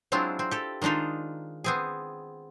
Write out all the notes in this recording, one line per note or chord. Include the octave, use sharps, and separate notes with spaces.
F#3 G#3 C4 D4 E4 F4
C4
G4 A4
D#3 G#3 D4 D#4 F4
B3 C4 G#4